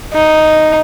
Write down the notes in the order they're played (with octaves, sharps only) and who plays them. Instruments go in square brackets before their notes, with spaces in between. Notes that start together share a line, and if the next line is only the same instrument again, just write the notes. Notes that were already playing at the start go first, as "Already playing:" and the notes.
[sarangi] D#4